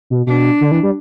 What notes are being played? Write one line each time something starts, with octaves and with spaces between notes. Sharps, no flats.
B2
B2 D4
D3
E3
G3